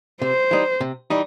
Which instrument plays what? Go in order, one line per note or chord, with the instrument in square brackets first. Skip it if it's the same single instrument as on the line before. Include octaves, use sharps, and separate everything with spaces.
[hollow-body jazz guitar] C3 [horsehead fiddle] C5
[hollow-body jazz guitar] E3 G3 D#4
C3
E3 G3 D#4